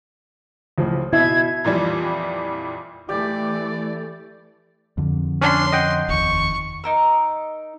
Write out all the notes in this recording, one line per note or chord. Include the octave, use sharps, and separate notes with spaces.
C#2 A2 F3
B2 E4 E5 G#6
F2 A#2 E3 G3
E3 A3 G4 D5
F2 D3
C#4 D4 C6
D#5 F#5 G5
F1 D#2 C#6
D#4 A#4 E6